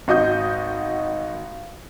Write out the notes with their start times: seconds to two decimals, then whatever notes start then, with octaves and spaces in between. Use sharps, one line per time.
0.08 G#1 F#4 D#5 D#6 G6